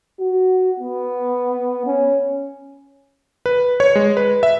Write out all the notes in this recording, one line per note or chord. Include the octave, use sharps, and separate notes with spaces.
F#4
B3
C#4
B4
C#5
G#3
B4
E5